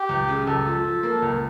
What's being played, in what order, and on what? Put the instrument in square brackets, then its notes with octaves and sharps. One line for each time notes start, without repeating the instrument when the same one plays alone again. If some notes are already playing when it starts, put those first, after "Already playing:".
Already playing: [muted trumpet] G4
[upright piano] C#2
C#3
[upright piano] C#2 [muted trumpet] A4
[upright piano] F3
F3
A#3
C#2